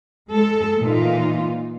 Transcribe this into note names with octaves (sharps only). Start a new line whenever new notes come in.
G#3 A4
A#2 E3 A#3 D#4 F4